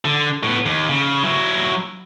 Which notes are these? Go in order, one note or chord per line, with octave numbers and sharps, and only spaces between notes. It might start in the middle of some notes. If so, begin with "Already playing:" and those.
D3
A2 B3
D#2
C#3
F#3 E4